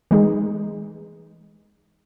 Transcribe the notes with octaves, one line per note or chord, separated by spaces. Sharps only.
E3 G#3 D#4 G#4